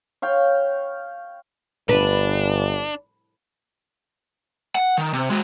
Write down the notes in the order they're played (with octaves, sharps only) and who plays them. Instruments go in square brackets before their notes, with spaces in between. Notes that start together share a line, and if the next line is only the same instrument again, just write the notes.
[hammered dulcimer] C#5 F5 G5
[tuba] G1 [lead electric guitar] D4 [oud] B4
[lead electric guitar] F#5
D#3
C3
G#3 F#4